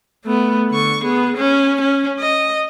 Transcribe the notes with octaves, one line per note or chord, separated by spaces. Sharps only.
A3 B3
D3 C#6
B3 G#4
C#4
C#4
D#5